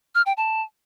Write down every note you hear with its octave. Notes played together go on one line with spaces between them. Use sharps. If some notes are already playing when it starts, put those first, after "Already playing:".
F6
G5
A5